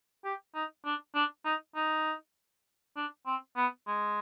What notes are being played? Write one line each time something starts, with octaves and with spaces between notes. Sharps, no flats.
G4
D#4
D4
D4
D#4
D#4
D4
C4
B3
G#3